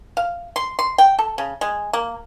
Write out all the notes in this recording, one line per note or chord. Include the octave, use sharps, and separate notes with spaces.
F5
C6
C6
G5
A4
C#3
G#3
A#3